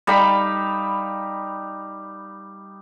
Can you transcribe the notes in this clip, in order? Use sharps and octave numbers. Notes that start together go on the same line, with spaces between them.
G3 D#4 F5 B5